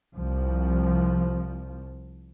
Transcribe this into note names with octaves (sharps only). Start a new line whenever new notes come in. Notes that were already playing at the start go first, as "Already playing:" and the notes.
C2 F3